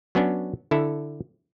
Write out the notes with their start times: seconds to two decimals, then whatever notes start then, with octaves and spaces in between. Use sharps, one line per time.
0.15 F#3 B3 C#4 D4
0.71 D3 E4 A4